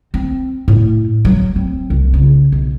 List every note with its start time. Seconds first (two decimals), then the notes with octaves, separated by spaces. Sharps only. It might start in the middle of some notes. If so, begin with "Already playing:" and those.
0.14 C4
0.68 A2
1.25 F#3
1.56 C4
1.90 C2
2.14 C#3
2.52 B1